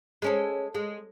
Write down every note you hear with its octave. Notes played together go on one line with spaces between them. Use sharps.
G#3 C#4 A4
G#3